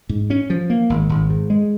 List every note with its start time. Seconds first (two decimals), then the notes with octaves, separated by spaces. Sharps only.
0.09 G#2
0.30 C#4
0.50 F3
0.70 A#3
0.90 G#1
1.09 G#1
1.30 G#2
1.50 G#3